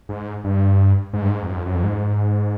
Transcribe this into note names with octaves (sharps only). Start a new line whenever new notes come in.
G#2
G2
G#2
G2
G#2
F2
F#2
F2
F#2
F2
G#2